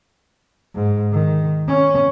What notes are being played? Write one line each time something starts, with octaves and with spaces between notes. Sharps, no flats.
G#2
D#3
C#4